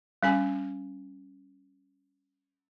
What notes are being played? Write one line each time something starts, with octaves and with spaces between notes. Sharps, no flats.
G3 C#4 G#5